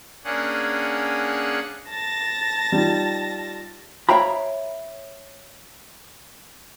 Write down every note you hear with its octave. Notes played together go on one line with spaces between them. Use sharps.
A#3 C#4 D4 G#4 F#5
A5 A6 A#6
G3 D#4 F4
C#5 E5 F5 G5 A#5 B5